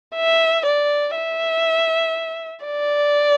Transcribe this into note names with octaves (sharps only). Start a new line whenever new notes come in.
E5
D5
E5
D5